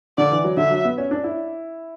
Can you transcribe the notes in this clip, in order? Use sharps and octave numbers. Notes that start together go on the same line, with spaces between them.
D3 D5
E3
F#3
D3 E5
F#3
B3
C#4
D4
E4